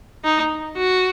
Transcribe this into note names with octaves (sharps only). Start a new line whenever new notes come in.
D#4
F#4